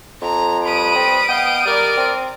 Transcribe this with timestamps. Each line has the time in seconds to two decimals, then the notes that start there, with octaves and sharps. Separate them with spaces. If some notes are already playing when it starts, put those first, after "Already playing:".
0.22 F2 A#5
0.65 G3 B4 B5 D#6 D7
0.96 C4
1.29 B3 D#5 F5 G5
1.65 G3 A#4 D5
1.97 C4